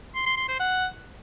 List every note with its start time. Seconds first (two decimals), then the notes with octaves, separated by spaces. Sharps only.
0.15 C6
0.26 C6
0.37 C6
0.48 C5
0.60 F#5